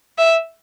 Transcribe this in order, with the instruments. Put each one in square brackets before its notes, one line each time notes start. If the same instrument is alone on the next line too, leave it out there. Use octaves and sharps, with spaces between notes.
[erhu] E5